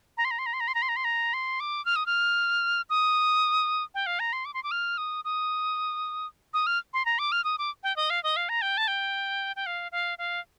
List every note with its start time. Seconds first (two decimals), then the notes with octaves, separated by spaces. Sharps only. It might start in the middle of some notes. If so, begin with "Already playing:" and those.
0.17 A#5
0.25 C6
0.31 A#5
0.39 C6
0.46 A#5
0.54 C6
0.60 A#5
0.68 C6
0.75 A#5
0.82 C6
0.89 A#5
0.96 C6
1.04 A#5
1.34 C6
1.60 D6
1.86 F6
1.96 D#6
2.06 F6
2.90 D#6
3.95 G5
4.06 F5
4.20 A#5
4.33 C6
4.45 D6
4.54 C6
4.63 D6
4.71 F6
4.98 D#6
5.25 D#6
6.54 D#6
6.67 F6
6.94 C6
7.06 A#5
7.19 D6
7.32 F6
7.44 D#6
7.59 D6
7.83 G5
7.96 D#5
8.10 F5
8.23 D#5
8.36 F5
8.49 A#5
8.62 G5
8.77 A5
8.88 G5
9.56 G5
9.66 F5
9.92 F5
10.18 F5